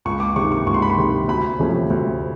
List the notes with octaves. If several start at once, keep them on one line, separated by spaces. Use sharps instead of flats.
C#2 C#6
D6
C3 D#3 C#6
C#6
C#2 C#6
C6
B5
C6
C3 D#3
D2 B5
C3 F3 A3 C#4
D2